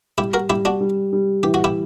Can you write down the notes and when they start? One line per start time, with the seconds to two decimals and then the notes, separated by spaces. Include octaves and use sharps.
0.18 G3 E4 G4
0.34 F#4 A#4
0.50 G3 E4 G4
0.65 D4 F#4
0.81 G3
1.13 G3
1.43 E3 G4
1.54 F#4
1.64 E4 G4